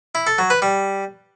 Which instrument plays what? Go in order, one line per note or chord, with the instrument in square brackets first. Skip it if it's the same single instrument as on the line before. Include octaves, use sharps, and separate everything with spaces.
[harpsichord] E4
A4
F#3
B4
G3